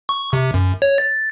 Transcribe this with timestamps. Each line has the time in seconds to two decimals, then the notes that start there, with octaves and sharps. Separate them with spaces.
0.09 C#6
0.33 C3
0.54 F#2
0.82 C#5
0.98 A6